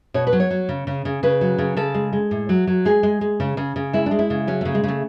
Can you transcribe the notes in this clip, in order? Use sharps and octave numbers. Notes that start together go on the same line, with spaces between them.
B2 C#5
B4
F#3
C#5
F#3
C#3
C#3
C#3
C#3 B4
F#3
C#3
C#3 A4
G#3
G#3
A2
F#3
F#3
G#3 G#4
G#3
G#3
C#3
C#3
C#3
G#3 E4
G#3 D4
E4
C#3
F#3 C#4
C#3 A3
G#3
C#3 A3